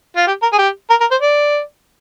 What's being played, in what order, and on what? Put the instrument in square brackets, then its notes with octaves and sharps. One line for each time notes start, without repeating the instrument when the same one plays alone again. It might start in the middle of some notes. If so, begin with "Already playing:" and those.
[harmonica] F4
G4
A#4
G#4
G4
A#4
A#4
C5
D5